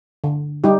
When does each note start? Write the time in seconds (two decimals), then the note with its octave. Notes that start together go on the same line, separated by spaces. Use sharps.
0.24 D3
0.64 G3 D#4 G4